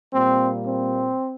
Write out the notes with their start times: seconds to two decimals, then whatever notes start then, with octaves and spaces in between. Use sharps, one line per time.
0.13 A#2 G3 A#3 C4
0.64 C4